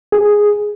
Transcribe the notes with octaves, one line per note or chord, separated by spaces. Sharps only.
G#4